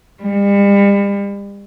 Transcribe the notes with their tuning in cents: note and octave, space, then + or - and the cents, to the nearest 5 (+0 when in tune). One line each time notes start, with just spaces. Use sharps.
G3 +40